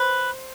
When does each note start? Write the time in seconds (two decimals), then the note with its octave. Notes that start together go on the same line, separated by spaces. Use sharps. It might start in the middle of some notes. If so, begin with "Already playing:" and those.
Already playing: B4 C5